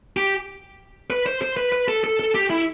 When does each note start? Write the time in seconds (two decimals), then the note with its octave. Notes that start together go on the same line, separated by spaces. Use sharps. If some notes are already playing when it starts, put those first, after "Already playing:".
0.17 G4
1.10 B4
1.26 C5
1.42 C5
1.57 B4
1.72 B4
1.88 A4
2.04 A4
2.19 A4
2.35 G4
2.50 E4